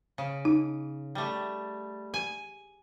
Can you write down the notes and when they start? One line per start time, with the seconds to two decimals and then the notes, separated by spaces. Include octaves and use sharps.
0.18 C#3
0.45 D#4
1.15 G3 A3
2.14 G#5